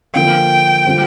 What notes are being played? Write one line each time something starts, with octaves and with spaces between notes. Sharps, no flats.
D3 F3 A#3 G5
D3 G3 C4 F4